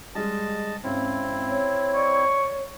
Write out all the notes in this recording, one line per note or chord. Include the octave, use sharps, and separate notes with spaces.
G3 G#3 D#5 A5
G#1 C4 C#4 E4
C#5
D5 C#6